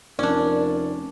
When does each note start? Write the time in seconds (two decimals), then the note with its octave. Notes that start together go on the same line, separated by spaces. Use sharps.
0.19 F1 C#4 D4 A#4 D5